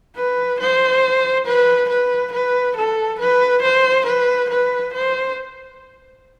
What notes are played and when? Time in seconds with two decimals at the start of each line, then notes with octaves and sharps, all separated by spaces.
0.16 B4
0.59 C5
1.46 B4
1.89 B4
2.32 B4
2.76 A4
3.19 B4
3.62 C5
4.06 B4
4.49 B4
4.93 C5